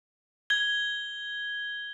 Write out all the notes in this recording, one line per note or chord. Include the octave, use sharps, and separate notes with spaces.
G#6 G7